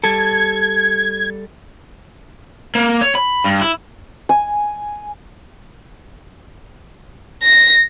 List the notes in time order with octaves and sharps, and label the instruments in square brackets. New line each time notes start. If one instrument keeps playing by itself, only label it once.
[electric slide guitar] G3 A4 [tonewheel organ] G#6
[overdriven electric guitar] A#3
C#5
B5
G2
E4
[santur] G#5
[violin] A#6